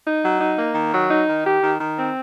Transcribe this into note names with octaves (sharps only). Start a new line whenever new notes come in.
D#4
F#3
D#4
A#3
D#3
F#3
D#4
D#3
G4
D#3
D#3
C4